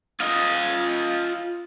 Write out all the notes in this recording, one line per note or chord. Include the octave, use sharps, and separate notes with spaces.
F4 D#5